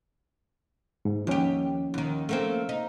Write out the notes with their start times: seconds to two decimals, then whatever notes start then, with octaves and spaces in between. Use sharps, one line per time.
1.05 G#2
1.27 D#2 F3 C#4 G4
1.94 D#2 D#3
2.29 A3 A#3 C4
2.69 D#4